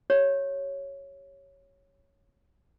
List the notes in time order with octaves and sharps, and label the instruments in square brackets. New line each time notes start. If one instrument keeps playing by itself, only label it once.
[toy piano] G4 C#5